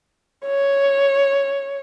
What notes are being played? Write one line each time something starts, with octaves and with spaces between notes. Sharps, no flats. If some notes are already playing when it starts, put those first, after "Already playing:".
C#5